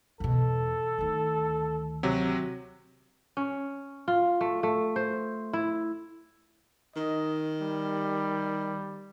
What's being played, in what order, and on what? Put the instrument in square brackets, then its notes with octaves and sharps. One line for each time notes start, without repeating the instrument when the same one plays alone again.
[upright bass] E2 B2 [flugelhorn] A4
[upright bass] D2 D#3
[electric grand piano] C3 F#3
[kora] C#4
F4
A3
A3
C5
E4
[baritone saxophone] D#3 [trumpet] D#5
[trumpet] G3